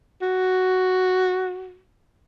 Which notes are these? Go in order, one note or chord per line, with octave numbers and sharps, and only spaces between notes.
F#4